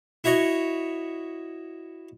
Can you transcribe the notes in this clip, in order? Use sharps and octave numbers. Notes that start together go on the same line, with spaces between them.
E4 F#4 C#5 D#5